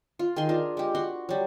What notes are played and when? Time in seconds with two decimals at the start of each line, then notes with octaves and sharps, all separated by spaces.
0.19 F4
0.36 D#3 G#4 G#5 C6
0.49 D4 F4 A#4
0.77 G#3 G4
0.95 F#4 F#5 C6
1.29 F#3 G3